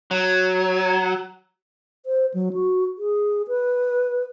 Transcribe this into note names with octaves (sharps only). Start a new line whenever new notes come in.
F#3
C5
F#3
F#4
G#4
B4